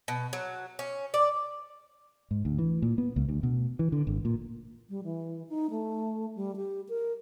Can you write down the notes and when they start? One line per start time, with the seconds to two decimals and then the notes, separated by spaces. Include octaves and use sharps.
0.08 B2
0.33 F#3
0.79 C#4
1.14 D5
2.31 G#2
2.45 D2
2.59 E3
2.82 A#2
2.98 B3
3.16 C#2
3.29 D2
3.43 B2
3.79 E3
3.92 D3
4.07 G#1
4.25 A#2
4.90 G3
5.04 E3
5.49 D#4
5.71 A3
6.36 G3
6.56 G4
6.89 A#4